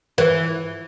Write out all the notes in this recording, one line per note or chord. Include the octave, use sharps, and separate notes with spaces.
E3